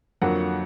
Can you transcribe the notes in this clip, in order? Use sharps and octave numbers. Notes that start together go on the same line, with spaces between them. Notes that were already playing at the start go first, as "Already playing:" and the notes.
F2 D3 F#3 A#3 F#5